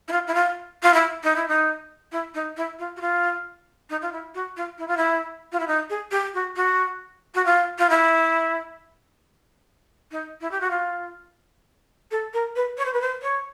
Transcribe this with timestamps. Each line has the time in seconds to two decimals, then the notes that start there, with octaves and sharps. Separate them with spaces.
0.08 E4
0.12 F4
0.27 E4
0.35 F4
0.83 F4
0.94 E4
1.24 D#4
1.36 E4
1.48 D#4
2.12 E4
2.34 D#4
2.57 E4
2.79 F4
2.97 F#4
3.01 F4
3.90 D#4
4.02 F4
4.12 E4
4.35 F#4
4.57 F4
4.79 E4
4.88 F4
4.97 E4
5.52 F4
5.60 E4
5.67 D#4
5.90 G#4
6.11 G4
6.34 F#4
6.56 F#4
7.35 F#4
7.46 F4
7.79 F4
7.90 E4
10.12 D#4
10.41 E4
10.51 G4
10.61 F#4
10.70 F4
12.11 A4
12.34 A#4
12.56 B4
12.78 C#5
12.85 C5
12.93 B4
13.01 C5
13.22 C#5